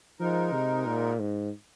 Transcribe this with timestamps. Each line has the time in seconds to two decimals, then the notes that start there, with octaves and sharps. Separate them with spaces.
0.19 G#2 F3 G#3 D#4 A#4
0.53 C3
0.86 A#2
1.20 G#2